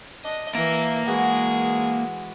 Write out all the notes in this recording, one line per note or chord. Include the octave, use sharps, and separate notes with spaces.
D4 D#5
E3 A#3 A#4 E5
E3 G#3 B3 F#4 G#4